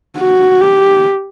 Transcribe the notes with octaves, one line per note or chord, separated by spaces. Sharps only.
F#4
G4